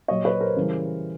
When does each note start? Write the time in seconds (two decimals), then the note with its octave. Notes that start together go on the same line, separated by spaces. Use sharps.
0.08 A#2 F#3 C#5 D#5
0.25 B4 C#5
0.41 A#4 C5
0.57 C#3 E3 G3